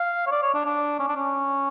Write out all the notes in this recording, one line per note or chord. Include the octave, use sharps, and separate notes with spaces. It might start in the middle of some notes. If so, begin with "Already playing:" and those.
Already playing: F5
C#5
D5
C#5
D4
D4
C#4
D4
C#4